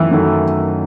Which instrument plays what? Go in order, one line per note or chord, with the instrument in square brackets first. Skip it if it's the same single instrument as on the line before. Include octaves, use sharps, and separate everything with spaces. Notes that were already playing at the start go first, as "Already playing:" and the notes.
Already playing: [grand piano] F#2 D#3 F#3 A3 [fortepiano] E3
[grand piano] F#2 D#3 F#3 A3